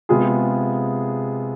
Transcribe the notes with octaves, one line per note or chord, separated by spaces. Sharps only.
C3 G#3 B3 F4 G#4